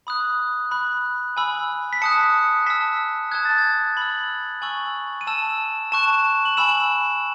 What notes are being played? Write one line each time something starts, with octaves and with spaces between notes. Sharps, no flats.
B5 D#6 F#6
B5 F#6
G#5 B5 E6
B6
A5 D#6 F#6 C#7
A5 E6 B6
A5 D#6 F#6 G#6
A6
G#6
B5 E6 F#7
G#5 C#6 E6 F#7
D#7
A5 E6 E7
A5 C#6 F#6 E7
F#7
G#5 B5 E6 E7